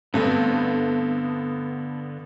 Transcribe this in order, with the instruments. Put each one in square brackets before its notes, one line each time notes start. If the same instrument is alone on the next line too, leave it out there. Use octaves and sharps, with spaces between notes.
[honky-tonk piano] G2 A3 C4 [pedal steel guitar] D3 B3